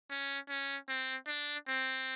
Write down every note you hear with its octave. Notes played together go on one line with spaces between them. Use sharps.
C#4
C#4
C4
D4
C4